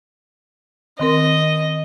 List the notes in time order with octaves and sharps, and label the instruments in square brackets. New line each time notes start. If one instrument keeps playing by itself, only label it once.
[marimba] D#3 C4 A#4 [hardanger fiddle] D#5